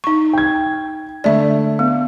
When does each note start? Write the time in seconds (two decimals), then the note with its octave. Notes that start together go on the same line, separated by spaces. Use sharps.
0.04 D#4 C#6
0.33 G5 G#6
1.24 D3 A3 D5 E5
1.79 B3